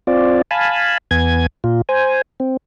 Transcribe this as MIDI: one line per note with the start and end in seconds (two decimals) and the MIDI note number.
0.07 0.42 60
0.07 0.42 65
0.07 0.42 74
0.51 0.98 77
0.51 0.98 80
0.51 0.98 81
0.51 0.98 83
1.11 1.46 40
1.11 1.46 59
1.11 1.46 80
1.11 1.46 92
1.64 1.81 46
1.64 1.81 65
1.89 2.22 72
1.89 2.22 80
2.40 2.57 60